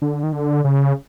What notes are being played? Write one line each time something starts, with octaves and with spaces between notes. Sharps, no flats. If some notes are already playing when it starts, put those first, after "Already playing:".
D3
D#3
D3
C#3